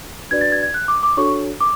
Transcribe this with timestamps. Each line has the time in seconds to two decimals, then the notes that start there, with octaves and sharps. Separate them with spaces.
0.31 D4 F#4 B4 D5 G#6
0.41 A6
0.52 G#6
0.63 G#6
0.74 F#6
0.88 D6
1.03 D6
1.17 D4 F#4 A4 C#5 C#6
1.61 D6